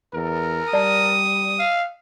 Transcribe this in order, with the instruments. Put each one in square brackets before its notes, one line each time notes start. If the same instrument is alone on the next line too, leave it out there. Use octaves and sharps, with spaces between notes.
[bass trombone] E2 [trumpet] A#4
[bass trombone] G3 [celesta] D5 A5 [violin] D#6
[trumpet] F5